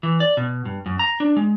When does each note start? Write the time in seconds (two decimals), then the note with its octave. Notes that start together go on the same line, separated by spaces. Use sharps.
0.03 E3
0.20 D5
0.37 B2
0.65 G2
0.86 F#2
0.99 A#5
1.20 D4
1.37 G#3